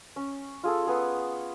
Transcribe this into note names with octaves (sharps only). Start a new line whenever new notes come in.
C#4
F4 G#4 A4
B3 G#4